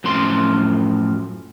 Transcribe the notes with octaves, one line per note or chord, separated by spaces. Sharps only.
F#2 A2 F3 C6